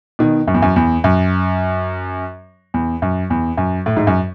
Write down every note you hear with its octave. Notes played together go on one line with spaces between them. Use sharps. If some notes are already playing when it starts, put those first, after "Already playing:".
B2 D#3
F#2
E2
F#2
E2
F#2
E2
F#2
E2
F#2
A2
G#2
F#2